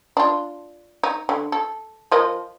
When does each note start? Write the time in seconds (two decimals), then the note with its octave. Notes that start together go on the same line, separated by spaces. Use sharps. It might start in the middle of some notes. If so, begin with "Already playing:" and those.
0.17 D4 F4
1.04 D#4
1.29 D3
1.52 A4
2.12 F3 A#4 D#5